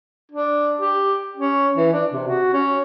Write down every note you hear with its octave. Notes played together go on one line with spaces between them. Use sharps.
D4
G4
C#4
E3
D4
C3
F#4
C#4